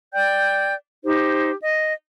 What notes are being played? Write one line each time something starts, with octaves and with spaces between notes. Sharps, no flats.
D5 G5 G6
D#4 G4 C5
D#5